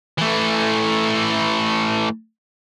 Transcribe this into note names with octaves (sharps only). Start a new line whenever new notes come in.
E3 A3